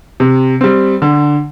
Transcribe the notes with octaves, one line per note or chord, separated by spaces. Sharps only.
C3
G3 C4
D3